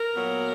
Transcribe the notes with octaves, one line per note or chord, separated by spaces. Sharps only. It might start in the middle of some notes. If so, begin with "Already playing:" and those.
Already playing: A#4
A#2 F#3 B3